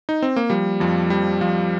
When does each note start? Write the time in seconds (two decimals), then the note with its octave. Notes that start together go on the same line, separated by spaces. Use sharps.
0.09 D#4
0.22 C4
0.36 A#3
0.50 F3 G3
0.80 F2 F3
1.10 F3 G3
1.41 F2 F3